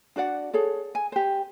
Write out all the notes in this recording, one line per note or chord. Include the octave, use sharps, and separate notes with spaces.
D4 F#4 D5 F#5
G#4 A4 C#5
G#5
G4 C5